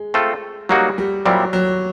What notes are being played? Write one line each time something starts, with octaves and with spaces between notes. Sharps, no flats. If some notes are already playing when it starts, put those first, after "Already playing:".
Already playing: G#3
A3 C4 F4 A4
F#3 G3 A#3 D#4 F#4
G3
A#2 F#3 G3 C4 E4
F#3